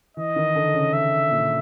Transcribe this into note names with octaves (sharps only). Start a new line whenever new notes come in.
E3 D#5
D#3
D3
C#3
E5
A#2